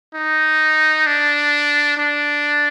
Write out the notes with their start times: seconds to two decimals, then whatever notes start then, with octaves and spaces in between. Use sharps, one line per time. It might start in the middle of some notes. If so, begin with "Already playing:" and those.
0.14 D#4
1.06 D4
1.97 D4